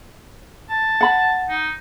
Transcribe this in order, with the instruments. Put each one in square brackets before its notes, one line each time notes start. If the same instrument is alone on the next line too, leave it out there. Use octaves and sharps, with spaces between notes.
[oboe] A5
[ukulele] F#5 B5
[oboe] D#4